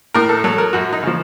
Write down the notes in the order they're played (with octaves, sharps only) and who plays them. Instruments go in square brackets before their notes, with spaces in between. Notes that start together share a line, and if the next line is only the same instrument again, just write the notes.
[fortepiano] A2 A#4
A4
F#3 A4
A#4
F#2 F#4
D#4
C#3 F3